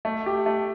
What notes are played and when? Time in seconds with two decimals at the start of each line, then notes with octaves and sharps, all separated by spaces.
0.05 A3
0.26 G4
0.46 A3